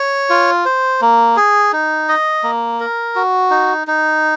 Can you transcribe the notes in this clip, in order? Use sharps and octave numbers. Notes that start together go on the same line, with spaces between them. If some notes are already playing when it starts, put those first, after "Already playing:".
Already playing: C#5
F4
C5
A#3
G#4
D#4
D#5
A#3
A#4
F#4
D#4
D#4